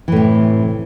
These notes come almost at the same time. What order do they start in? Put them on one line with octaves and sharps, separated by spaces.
E3 A2 C3